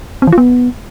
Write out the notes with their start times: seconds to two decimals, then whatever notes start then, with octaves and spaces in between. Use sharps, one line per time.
0.22 C4
0.27 E3
0.32 F4
0.38 B3